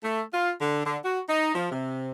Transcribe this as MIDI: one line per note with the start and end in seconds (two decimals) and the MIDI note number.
0.03 0.21 57
0.33 0.51 65
0.61 0.83 50
0.85 0.97 50
1.04 1.20 66
1.29 1.53 63
1.55 1.69 53
1.71 2.12 48